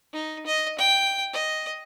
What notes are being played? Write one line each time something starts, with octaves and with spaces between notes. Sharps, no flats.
D#4
D#5
G5
D#5